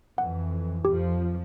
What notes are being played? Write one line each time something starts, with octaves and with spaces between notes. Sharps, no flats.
F2 E3 F#5
F2 F3 G4